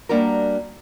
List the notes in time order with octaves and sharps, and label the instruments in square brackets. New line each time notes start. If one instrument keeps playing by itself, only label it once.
[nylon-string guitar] G3 A#3 D4 F#4 A#4